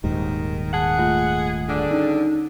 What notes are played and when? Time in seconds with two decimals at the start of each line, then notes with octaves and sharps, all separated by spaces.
0.04 D#1 D#2 G#2 D#3
0.74 G#4 F#5 A5
0.98 A3 F4
1.69 D3 G3 D4 G#4
1.91 C#4 D#4